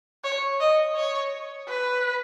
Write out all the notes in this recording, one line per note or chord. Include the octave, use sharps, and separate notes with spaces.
C#5
D#5
C#5
B4